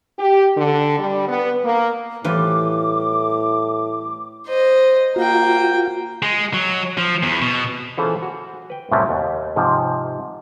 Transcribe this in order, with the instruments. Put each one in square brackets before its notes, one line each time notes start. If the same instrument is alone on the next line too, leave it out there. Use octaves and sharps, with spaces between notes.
[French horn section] G4
D3
G3
B3
A#3
[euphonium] A2 [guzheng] E3 G3 F4 [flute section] D6
[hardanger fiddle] C5 D#5
[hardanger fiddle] A#3 G5 [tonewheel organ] F4 F#4
[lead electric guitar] G#3
F#3
F3
E2
B2
[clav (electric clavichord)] E3 C#4 F4 G#4 A4 C5
F#4
B4 G5
C2 F#2 A2 C3 F#3 G3
D#2
G#2 C3 F3